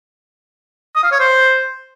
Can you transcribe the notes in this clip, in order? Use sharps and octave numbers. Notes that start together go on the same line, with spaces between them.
D#6
F5
C#5
C5